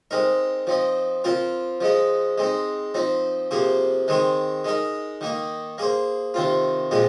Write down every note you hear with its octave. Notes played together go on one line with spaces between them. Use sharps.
G#3 C4 D#4 A#4
F3 C4 D#4
F3 C4 F4 A#4
F3 G#3 D#4
G#3 C4 D#4
F3 C4 D#4
C3 F3 A#3 G#4 C5
D#3 G#3 C4 G#4 C5
G#3 D#4 A#4
D#3 A#3 D#4
A#3 G#4 C5
C3 D#3 C4 F4
A#2 F3 G#3 C4 G#4